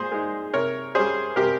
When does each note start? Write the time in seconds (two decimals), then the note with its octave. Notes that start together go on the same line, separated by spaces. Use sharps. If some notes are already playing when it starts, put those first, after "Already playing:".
Already playing: A#2 G#4 C5
0.12 G#3 D#4
0.54 C3 A#4 C#5
0.95 G3 C#4 G#4 C5
1.36 C3 G4 A#4